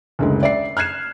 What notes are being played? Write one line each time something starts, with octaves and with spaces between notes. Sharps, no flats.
F#1 D2 G#3
D5 E5 C7
F6 F#6 G#6 C7 E7